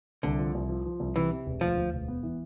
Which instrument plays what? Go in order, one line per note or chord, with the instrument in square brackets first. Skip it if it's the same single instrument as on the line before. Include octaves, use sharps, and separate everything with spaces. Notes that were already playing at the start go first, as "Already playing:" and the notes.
[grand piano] C2 [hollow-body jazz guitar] D3
[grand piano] F3
C2
F3
F3
C2
[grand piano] C3 [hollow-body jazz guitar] E3
[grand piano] C3
E1
[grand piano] D2 [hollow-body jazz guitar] F3
[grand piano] D2
E1
B3
E3